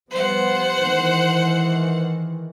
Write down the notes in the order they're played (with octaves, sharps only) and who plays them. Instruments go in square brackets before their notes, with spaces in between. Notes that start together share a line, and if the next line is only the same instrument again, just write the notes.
[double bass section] F3 G3 B3 [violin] C5 F#5
[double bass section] D#3 E3 G#3